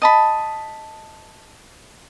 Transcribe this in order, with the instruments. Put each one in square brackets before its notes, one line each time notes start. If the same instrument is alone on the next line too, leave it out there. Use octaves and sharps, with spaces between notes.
[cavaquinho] D#5 A5 B5